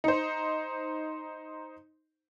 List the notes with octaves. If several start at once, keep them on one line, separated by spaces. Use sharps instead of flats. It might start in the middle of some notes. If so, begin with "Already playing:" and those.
D#4 C5